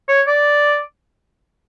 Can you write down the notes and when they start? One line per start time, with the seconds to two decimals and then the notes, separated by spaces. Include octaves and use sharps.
0.09 C#5
0.27 D5